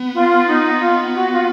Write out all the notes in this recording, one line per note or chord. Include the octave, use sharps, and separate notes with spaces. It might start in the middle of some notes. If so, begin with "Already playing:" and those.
Already playing: B3
F4
D#4
F4
F#4
F4